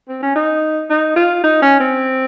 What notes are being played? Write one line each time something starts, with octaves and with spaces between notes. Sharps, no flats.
C4
C#4
D#4
D#4
F4
D#4
C#4
C4